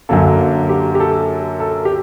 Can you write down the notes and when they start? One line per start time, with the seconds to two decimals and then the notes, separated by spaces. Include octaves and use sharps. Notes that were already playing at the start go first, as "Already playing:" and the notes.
0.09 F#2 D3 F#3 A#3 A4
0.69 G4
0.95 G4
1.00 A4
1.60 A4
1.85 G4